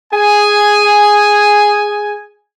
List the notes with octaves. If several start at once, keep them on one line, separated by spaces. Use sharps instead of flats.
G#4 G#5